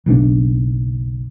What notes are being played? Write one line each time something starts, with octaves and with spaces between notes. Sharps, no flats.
F#1 B1 C4 D4